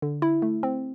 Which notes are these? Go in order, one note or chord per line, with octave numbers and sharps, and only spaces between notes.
D3
E4
A3
C4